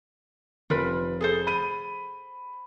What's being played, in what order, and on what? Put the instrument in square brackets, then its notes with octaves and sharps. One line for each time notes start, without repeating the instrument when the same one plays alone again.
[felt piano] F1 [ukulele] F4 A#4 B4
[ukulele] G#4 A4 C5
[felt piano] B5 D#7